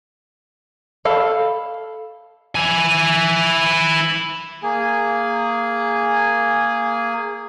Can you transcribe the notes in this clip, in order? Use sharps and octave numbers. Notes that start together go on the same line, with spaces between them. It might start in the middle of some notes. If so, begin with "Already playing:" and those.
A4 F5 B5
E4 G#5
A#3 G#4 G#5